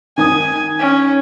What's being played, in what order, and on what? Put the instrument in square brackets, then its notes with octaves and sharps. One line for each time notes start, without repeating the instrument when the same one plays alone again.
[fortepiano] D#3 D#6 [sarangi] G#5
[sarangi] C#4